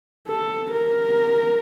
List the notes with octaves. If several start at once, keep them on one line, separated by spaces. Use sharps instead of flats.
A4
A#4